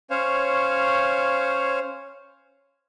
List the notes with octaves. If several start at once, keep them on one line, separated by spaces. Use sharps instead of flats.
C#4 C5 C#5 F5